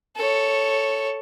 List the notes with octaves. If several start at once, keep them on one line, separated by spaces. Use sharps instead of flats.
A4 C#5